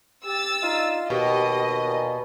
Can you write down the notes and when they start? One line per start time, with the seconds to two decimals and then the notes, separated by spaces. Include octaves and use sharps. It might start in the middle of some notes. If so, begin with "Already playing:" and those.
0.25 G4 E6 A6
0.63 D4 D#4 F4
1.10 D#2 B2 G4 D#5
1.85 A#2